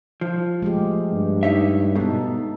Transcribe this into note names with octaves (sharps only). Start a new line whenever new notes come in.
F3
G#3 A3 G4
G2
D#4 C#5 E5
G#2 B2 D#4 A4